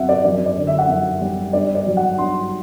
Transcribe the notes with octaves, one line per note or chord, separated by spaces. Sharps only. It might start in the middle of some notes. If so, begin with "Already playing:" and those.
Already playing: F#2 F#3 C4 E5 F#5
D5
F#2 D5
D5
D3
E5
F#5
F#2 E5
G3
G2 D5
D5
F#3
F#5
G2 C6